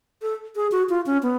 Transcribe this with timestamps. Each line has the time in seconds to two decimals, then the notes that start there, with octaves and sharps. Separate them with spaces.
0.22 A4
0.56 G#4
0.72 F#4
0.89 F4
1.06 C#4
1.23 B3